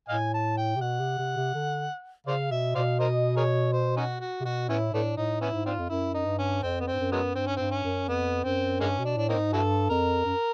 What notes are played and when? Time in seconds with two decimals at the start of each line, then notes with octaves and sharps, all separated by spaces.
0.09 A2 D#5 F5 G#5
0.34 A5
0.57 G5
0.76 C3
0.81 B2 F#5
1.00 C3
1.18 C3
1.36 C3
1.54 D3
2.26 C#3 C5 D5 F5
2.51 B2 E5
2.75 B2 C5 D5 F5
3.00 A#4 C5 D#5
3.36 G#4 A#4 C#5
3.72 C5
3.97 C#4 D#4 F#4
4.21 F#4
4.40 C3
4.45 B2 F#4
4.69 A2 B3 C#4 E4
4.93 A2 A3 B3 D4
5.17 A2 D#4
5.41 B3 C#4 E4
5.53 G#2
5.66 C4 D4 F4
5.79 F2
5.90 F#2 E4
6.14 D#4
6.26 G2
6.39 C#4
6.62 F2 C4
6.80 B3
6.87 C4
6.93 G2
7.00 F#2
7.12 F#3 G#3 B3
7.35 G2 C4
7.47 C#4
7.57 G2 C4
7.71 C#4
7.84 F#2
8.08 F2 B3
8.44 F#2 C4
8.80 G2 G#3 A#3 C#4
8.99 B2
9.05 D4
9.17 A2 D4
9.29 A#3 C4 D#4
9.36 G#2
9.53 G2 E4 F#4 A4
9.90 F2 A#4
10.25 F#2